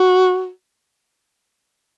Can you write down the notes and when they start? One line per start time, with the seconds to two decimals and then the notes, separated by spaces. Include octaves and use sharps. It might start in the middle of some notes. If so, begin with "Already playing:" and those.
Already playing: F#4